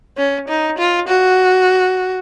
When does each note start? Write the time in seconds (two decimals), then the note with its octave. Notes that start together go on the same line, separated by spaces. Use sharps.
0.17 C#4
0.48 D#4
0.78 F4
1.07 F#4